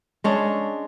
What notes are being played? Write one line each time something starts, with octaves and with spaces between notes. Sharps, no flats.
G#3 C#4 D4